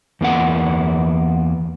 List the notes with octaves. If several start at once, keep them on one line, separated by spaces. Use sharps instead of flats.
E2 A#3 B3 F#5